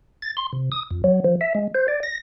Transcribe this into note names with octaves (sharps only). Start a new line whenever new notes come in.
A6
C6
C3
D#6
F2
F#3
F3
E5
G#3
C5
D5
A#6